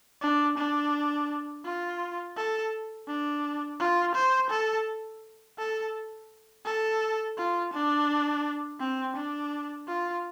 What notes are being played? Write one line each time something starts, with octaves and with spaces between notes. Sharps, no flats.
D4
D4
F4
A4
D4
F4
C5
A4
A4
A4
F4
D4
C4
D4
F4